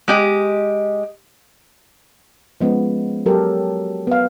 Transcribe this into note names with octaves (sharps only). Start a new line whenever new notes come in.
G#3 G4 D#5
F3 G#3 B3 C#4
F#3 G4 A4 A#4
B3 F5